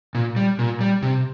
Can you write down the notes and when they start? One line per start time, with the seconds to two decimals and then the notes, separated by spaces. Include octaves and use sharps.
0.15 A#2
0.36 G3
0.59 A#2
0.81 G3
1.03 C3